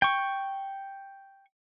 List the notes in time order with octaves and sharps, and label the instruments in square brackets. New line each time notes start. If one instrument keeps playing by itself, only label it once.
[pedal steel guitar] G5 C#6